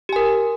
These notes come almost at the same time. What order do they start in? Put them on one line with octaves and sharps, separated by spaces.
G4 G#5 A#4